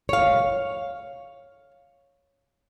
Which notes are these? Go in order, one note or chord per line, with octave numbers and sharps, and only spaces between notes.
C#5 F5